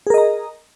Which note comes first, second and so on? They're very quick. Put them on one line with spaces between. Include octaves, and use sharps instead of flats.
G#4 A#4 D#5 A#5